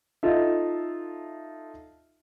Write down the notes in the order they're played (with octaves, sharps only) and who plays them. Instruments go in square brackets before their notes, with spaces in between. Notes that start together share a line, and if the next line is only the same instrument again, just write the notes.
[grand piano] D#4 F4 A4 E5